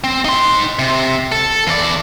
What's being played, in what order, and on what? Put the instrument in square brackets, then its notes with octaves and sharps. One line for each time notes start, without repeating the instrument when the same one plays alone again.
[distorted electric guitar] C4
D#4 C6
C3
A4
E2 D5